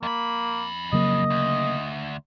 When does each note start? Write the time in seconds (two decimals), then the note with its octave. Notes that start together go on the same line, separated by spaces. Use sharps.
0.03 F2 A#3 B5
0.93 C#3 F#3 A#3 D#5
1.30 D2